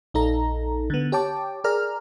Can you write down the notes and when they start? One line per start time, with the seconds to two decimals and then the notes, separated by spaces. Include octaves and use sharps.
0.14 A#1 D#4 A4 A#5
0.90 D3 B3
1.12 G4 C#5 G5 A5 D6
1.64 G#4 A#4 D5 A#5 F6